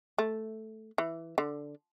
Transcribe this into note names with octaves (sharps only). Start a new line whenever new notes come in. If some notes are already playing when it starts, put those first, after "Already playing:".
A3
E3
D3